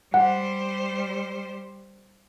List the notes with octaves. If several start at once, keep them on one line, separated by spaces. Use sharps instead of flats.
G3 C5 F#5